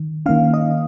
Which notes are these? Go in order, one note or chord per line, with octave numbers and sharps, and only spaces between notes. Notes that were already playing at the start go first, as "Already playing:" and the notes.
Already playing: D#3
D#3 A#3 C#4 F5
D#5